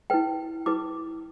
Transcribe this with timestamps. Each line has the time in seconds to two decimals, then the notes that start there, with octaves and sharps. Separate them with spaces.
0.10 E4 B4 G5
0.66 E4 B4 D6